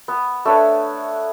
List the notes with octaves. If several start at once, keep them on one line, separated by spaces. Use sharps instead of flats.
B3
A3 D4 B4 C#5